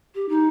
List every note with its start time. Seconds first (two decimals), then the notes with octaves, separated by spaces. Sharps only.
0.15 G4
0.29 D#4